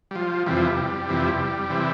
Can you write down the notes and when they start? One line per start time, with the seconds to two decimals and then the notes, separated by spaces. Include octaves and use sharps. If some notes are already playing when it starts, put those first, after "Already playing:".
0.11 G3
0.15 F3
0.46 F2 C3 E3 G3
0.57 F3
0.67 G3
1.09 F2 C3 E3
1.70 C3 E3